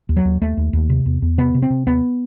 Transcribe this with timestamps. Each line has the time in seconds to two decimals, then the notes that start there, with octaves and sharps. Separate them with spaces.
0.09 D#2
0.17 F#3
0.25 D#2
0.42 D#2 A3
0.57 D#2
0.73 D#2
0.90 C3
1.06 E2
1.22 E2
1.38 C3 B3
1.54 C3
1.62 C4
1.70 C3
1.87 D#2 B3